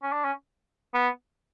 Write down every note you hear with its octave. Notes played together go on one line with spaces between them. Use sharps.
C#4
D4
C#4
B3